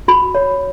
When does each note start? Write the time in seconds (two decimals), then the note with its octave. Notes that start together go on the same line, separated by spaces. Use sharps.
0.08 F#4 B5
0.35 C#5